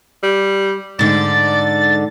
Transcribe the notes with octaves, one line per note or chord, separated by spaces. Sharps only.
G3
G#2 D3 D5 A6